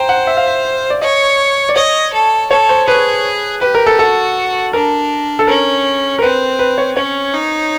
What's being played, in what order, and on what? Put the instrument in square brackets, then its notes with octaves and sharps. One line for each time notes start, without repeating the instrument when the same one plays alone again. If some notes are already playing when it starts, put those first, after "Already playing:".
Already playing: [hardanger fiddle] C5 [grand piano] G5 A#5
[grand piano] F#5
E5
F5
E5
D5
[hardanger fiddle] C#5 [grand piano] D#5
[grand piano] D5
[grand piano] C#5 [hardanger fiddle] D#5
[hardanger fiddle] A4
[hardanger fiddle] A4 [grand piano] C#5
[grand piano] C5
[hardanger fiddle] G#4 [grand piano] B4
[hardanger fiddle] G4 [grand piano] B4
[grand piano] A#4
A4
[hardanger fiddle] F#4 [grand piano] A4
[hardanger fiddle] D4 [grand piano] A#4
[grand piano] A4
[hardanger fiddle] C#4 [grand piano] A#4
[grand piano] A#4
[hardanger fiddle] C4 [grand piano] B4
[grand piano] B4
C#5
[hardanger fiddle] C#4 [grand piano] C#5
[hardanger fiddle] D#4